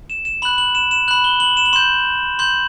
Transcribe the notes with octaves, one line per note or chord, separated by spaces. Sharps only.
E7
E7
B5 F#6 F#7
F#7
E7
E7
B5 F#6 F#7
G7
F#7
E7
F#7
C6 G6 E7
C6 G6 F#7